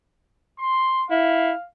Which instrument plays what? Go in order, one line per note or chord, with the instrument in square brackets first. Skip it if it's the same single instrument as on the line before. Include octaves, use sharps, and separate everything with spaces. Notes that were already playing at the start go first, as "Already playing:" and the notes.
[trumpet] C6
[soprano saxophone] E4 [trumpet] F5